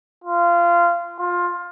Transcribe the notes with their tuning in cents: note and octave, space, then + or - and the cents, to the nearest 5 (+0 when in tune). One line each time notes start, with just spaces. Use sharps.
F4 -20
F4 +15